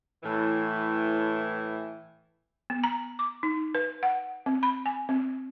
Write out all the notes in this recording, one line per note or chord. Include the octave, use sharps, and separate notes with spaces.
A2 E3
B3
A#5
D6
D#4
B4
F#5
C4
B5
G#5
C4